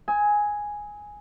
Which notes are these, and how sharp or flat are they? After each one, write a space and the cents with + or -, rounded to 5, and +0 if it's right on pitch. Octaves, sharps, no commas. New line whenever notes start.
G#5 +0 D#6 +40